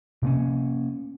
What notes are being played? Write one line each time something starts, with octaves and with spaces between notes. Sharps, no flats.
C3 A#3 C#4